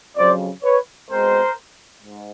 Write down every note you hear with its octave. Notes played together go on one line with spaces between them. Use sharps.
F2 C#3 F#3 C5 D5
B4 C#5
B2 G#3 C4 A#4 C5
G#2